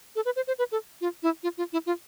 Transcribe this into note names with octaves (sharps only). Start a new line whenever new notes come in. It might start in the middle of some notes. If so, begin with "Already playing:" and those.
A4
B4
C5
C5
B4
A4
F4
E4
F4
F4
E4
F4